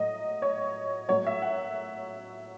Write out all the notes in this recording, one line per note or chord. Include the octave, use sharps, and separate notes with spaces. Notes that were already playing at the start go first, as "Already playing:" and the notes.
Already playing: A2 F#3 D#5
C#5
A2 F#3 C#5
E5
F#5